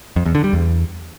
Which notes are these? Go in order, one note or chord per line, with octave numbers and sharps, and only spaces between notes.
F2
E2
D3
G3
E2